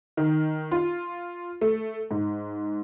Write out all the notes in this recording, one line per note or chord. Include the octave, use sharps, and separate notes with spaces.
D#3
F4
A3
G#2